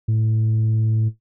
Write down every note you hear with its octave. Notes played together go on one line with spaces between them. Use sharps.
A2